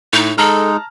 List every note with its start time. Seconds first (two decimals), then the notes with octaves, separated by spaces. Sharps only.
0.13 A2 D#4
0.38 G#3 D#4 A4 A5 A#5 F6